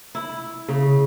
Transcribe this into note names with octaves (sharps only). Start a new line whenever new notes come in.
E4
C#3